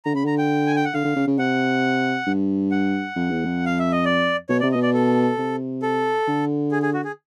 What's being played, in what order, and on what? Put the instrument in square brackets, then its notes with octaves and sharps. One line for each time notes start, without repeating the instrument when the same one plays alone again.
[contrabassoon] D3 [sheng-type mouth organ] A#5
[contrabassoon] C#3 [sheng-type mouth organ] B5
[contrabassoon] D3 [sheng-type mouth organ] A#5
[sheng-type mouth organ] G5
G#5
G5
F#5
[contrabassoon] D3 [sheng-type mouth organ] F5
[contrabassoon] D3
C#3
C#3
[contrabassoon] C3 [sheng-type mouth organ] F#5
[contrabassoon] G2
[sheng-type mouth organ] F#5
[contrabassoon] F2
E2
F2
[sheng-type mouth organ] F5
E5
D#5
D5
[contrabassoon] B2 [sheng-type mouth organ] C#5
[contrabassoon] C3 [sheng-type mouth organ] D5
[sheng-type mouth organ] D#5
[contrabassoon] B2
[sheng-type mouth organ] D5
A4
[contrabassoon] C3
[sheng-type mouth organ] A4
[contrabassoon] D3
[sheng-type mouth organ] G#4
G#4
F#4
G#4